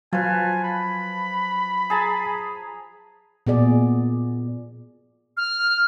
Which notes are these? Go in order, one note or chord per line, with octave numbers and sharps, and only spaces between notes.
F3 F#3 B4 F5 G#5
B5
G#4 A5 A#5
A#2 B3 G#4 D5
F6